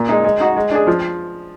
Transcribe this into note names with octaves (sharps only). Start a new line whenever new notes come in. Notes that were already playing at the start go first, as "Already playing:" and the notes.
Already playing: A#2
G#3 D#4
G#3
D#4 F#4
G#3
D4 G#4
F3